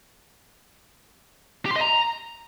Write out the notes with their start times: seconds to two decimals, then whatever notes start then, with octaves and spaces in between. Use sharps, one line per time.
1.66 G4
1.71 C6
1.76 D#5
1.81 A#5